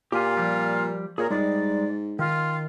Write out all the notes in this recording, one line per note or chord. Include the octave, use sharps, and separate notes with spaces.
A#2 F4 G4 G#5
F3 G3
A#2 G#4 A#4 C#5
G#2 G3 G#3 D#4 D5
D#3 F4